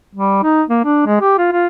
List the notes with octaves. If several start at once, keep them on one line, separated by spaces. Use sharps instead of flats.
G3
D#4
A#3
D4
G#3
G4
F4
F4